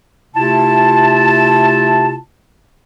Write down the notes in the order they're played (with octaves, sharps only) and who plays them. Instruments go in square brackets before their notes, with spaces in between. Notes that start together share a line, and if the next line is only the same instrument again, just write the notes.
[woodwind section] C3 A3 E4 F4 A5